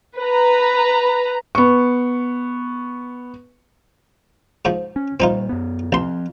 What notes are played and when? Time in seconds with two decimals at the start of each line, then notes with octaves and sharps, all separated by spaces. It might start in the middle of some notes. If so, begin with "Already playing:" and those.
0.18 B4 A#5
1.55 B3 C#6
4.65 G#2 F3
4.96 C#4
5.20 A#2 G3 C4 D#4 F4
5.49 F#2 B3
5.92 A1 F3 C4 C6